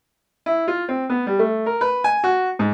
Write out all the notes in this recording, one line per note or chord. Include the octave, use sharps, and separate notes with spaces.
E4
F4
C4
B3
G3
A3
A#4
B4
G#5
F#4
G#2